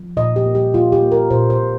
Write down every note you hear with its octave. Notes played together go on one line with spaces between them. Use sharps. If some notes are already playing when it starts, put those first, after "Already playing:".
Already playing: F3
A#2 D#5
G4
A#3
G4
A#3 F4
G4
A#3
A#4
A#2 C5
C5
A#2